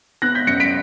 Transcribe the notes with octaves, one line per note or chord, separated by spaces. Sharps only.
B3 F#6 A#6
G6 B6
F#2 A#6 C#7
B6 D7